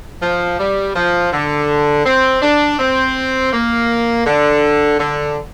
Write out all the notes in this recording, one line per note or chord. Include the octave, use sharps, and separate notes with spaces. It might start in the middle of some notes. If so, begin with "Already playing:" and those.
F3
G3
F3
D3
C4
D4
C4
A#3
D3
D3